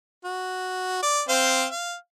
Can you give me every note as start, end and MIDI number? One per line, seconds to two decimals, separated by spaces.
0.25 1.02 66
1.03 1.22 74
1.29 1.65 60
1.29 1.65 72
1.29 1.65 77
1.71 1.94 77